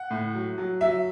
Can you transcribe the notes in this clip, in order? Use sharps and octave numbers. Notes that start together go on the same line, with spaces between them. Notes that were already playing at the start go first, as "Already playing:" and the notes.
Already playing: F#5
A2
F#3
F#3
F#3 E5